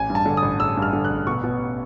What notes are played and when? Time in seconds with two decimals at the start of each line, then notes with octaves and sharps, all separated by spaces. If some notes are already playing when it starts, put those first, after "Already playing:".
Already playing: A1 G#5
0.10 G2
0.15 A5
0.26 D3
0.37 A1 D#6
0.59 A1 E6
0.77 G2
0.82 F6
0.93 D3
1.05 F#6
1.10 A1
1.27 B2 C#6
1.44 B2